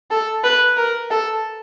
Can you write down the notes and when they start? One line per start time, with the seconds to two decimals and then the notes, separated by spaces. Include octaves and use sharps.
0.11 A4
0.44 B4
0.77 A#4
1.11 A4